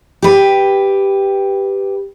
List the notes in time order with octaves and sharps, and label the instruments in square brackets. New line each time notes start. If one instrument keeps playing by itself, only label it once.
[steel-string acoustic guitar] G4 B4